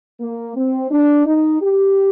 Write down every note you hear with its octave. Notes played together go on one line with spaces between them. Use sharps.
A#3
C4
D4
D#4
G4